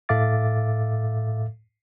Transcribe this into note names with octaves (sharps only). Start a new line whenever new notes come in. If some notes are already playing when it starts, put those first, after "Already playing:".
A2 A4 E5 F5 D6 A6